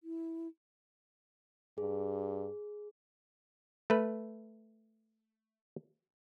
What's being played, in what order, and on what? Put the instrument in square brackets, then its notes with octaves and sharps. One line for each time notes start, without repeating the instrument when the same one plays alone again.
[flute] E4
[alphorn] G2 [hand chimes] G#4
[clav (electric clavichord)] A3 B4